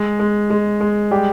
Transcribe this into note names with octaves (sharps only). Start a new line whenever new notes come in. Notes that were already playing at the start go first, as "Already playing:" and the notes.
Already playing: G#3
G#3
G#3
G#3
G3 G4